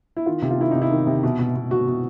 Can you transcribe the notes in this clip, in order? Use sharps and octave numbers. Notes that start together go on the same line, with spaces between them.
E4
D#3 F4
C3
F4
D#3 E4
C3 D#4
E4
D#3
C3
B2
B2
B2
B2 F#4
B2